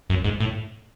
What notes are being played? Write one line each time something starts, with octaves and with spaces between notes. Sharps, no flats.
F#2
G#2
A2